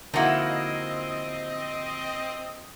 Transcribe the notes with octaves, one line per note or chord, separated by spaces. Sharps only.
D3 F3 A#3 C4 D#4 E4 F#4 D#5